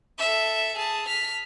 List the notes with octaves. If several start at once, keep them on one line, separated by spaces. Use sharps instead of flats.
A4 E5
G#4 A5
F6 B6